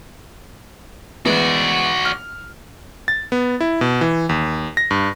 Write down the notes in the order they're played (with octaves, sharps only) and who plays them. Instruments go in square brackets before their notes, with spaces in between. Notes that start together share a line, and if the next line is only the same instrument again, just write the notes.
[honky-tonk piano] E3 G#3 B3 [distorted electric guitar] F#4 D5
[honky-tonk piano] F6
[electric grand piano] A6
B3
E4
B2
E3
D#2
A#6
G2